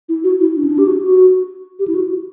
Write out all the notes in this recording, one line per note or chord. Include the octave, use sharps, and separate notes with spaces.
E4
F#4
E4
D4
C#4
D4
G4
F#4
F#4
G4
E4
F#4